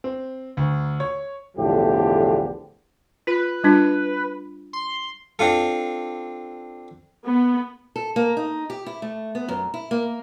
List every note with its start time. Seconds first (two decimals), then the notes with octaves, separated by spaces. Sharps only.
0.04 C4
0.57 D2
1.00 C#5
1.57 B1 E2 A2 D3 F3 G4
3.27 F4 B4
3.64 G3 D4 F4
4.73 C6
5.39 C4 D4 F4 A4
7.25 B3
7.96 A4
8.16 A#3
8.37 D#4
8.70 G4
8.86 E4
9.02 A3
9.35 B3
9.48 F#2
9.74 E4
9.91 A#3